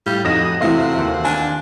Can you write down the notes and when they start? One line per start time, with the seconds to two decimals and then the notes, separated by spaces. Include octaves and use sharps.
0.06 A2 G3 F4
0.25 F2 A2 D#4 F#4 D#6 A#6 E7
0.61 C3 E3 A3 C4 F#4 F5
0.93 D#2 F5
1.25 D4 G#5